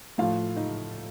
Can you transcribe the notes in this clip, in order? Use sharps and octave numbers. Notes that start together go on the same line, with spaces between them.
A2 F3 F4 F5
D#4 D#5